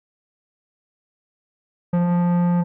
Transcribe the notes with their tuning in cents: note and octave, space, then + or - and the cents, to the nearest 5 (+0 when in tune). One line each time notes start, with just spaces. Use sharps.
F3 +5